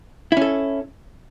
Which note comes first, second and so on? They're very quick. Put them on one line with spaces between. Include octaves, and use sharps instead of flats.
E4 C#4 A4